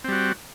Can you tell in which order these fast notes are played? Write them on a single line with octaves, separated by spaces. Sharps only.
C4 G3 F#4